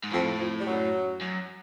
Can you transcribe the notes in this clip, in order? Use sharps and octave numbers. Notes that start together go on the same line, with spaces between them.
G#2
F2 A2 F3
F2 F3
G3
F#2 F#3
F#2